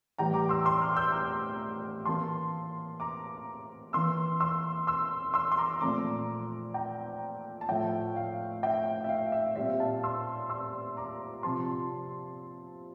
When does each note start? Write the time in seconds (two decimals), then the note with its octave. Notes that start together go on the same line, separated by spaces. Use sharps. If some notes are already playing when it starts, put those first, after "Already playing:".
0.18 A2 E3 G3 G5 A#5
0.34 A#5 D6
0.49 C6 E6
0.65 C6 E6
0.81 D6 F6
0.96 E6 G6
1.12 A#5 D6
2.06 E3 A#3 A5 C6
3.00 A#5 D6
3.93 E3 A#3 C6 E6
4.40 C6 E6
4.87 C6 E6
5.34 C6 E6
5.52 C6
5.58 A#5 D6
5.81 A#2 F3 A3 C4 A#5 D6
6.74 G5 A#5
7.61 A5
7.69 A2 F3 A3 E5 G5
8.16 F5
8.63 E5 G5
9.04 E5
9.09 F5
9.32 E5
9.56 A#2 G3 C4 E5
9.80 F5 A5
10.03 C6 E6
10.50 C6 E6
10.97 A#5 D6
11.43 C3 F3 C4 A5 C6